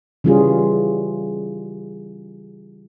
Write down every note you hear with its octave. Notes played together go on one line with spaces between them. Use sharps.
C#3 E3 G3 C#4 F4 G#4